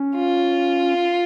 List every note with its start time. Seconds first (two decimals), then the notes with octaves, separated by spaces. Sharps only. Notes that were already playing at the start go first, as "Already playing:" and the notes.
Already playing: C#4
0.16 F4